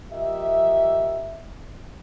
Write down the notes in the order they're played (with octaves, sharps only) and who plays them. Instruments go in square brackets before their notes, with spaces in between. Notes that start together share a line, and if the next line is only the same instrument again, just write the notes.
[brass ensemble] F3 G4 A#4 D#5 E5